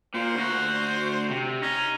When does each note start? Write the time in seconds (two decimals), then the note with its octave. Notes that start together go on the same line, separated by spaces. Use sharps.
0.14 A#2 C5
0.35 D2 F#4
1.30 C3
1.62 C#4 D#4